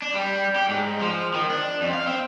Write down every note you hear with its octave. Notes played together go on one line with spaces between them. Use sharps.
D4
G3
G4
G#2
F3
D#3
D4
F2
F5
C4